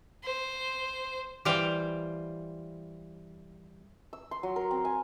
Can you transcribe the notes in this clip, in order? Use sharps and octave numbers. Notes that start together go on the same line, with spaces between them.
C5
E3 G3 C5 F5 G5
E6
C6
F#3
A#4
C4
G#5